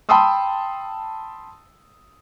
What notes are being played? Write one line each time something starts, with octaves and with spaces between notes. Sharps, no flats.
G5 A5 B5 C6 D#6 E6